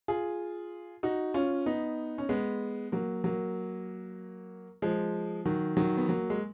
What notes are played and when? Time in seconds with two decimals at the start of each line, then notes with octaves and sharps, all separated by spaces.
0.08 F4 G#4
1.03 D#4 F#4
1.34 C#4 F4
1.66 B3 D#4
2.18 C#4
2.29 G#3 B3
2.92 F#3 A#3
3.24 F#3 A#3
4.82 F3 G#3
5.45 D#3 F#3
5.77 D#3 F#3
5.97 B3
6.09 F#3 A#3
6.30 G#3